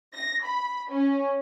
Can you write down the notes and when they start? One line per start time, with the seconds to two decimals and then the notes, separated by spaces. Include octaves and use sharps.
0.14 A#6
0.45 B5
0.91 C#4